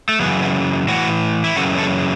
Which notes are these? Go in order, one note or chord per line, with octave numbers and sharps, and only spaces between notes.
A3
F#2 C#3 E3 B3
B3
A2 E3 F#4
E4
F#2 C#3 E3 F#4
A4